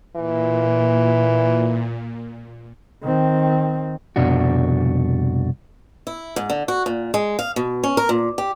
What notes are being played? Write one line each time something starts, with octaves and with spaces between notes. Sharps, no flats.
A#2 E3
D#3 C4
C2 F2 B2 D4 F#4
E4
G#2
D3
F#4
A#2
G#3
F5
B2
C#4
A#4
A#2
G4